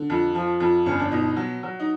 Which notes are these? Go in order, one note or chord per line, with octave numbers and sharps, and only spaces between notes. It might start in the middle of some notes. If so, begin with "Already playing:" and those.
Already playing: D3
F2
F3
F2
G1 C#4
D4
B2 D#4
F#3
F#3
D#4